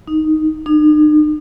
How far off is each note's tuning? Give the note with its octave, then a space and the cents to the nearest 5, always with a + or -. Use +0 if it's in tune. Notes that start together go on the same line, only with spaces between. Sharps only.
D#4 +0
D#4 -45